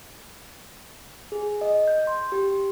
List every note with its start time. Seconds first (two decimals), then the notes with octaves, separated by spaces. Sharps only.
1.32 G#4
1.61 D#5
1.88 G6
2.07 C6
2.32 G4